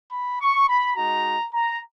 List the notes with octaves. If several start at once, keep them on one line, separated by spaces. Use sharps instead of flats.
B5
C#6
B5
G#3 D#4 F#4 A#5
A#5